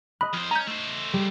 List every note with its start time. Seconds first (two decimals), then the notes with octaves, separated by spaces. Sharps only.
0.21 D#5 B5 D#6 F#6
0.34 F2 C5 F6
0.51 C#4 A#5 G6
0.68 A3 C5
1.13 G3